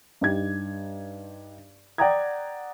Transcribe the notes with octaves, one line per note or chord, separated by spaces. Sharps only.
G2 D#4 G4 G#6
D5 F#5 G5 A#5 D#6 G#6